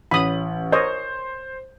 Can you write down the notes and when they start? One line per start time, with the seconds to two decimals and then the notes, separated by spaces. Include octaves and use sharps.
0.11 A1 C#4 B5 D#6 F#7
0.72 A#4 C5 C#5 D#5